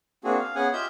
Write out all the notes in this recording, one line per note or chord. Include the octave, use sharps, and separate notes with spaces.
A#3 C4 D4 F#4 G#4
F5
B3 C#4 G#4 F#5 G#5
F4 G4 D#5 E5 E6 G6